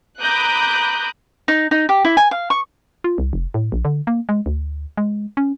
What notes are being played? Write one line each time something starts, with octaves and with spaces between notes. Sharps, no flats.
A#5 B5 D6 D#6 F#6 G6
D#4
D#4
G4
E4
G#5
F5
C#6
F4
C2
F1
A2
A#1
D3
A#3
G#3
D2
G#3
C#4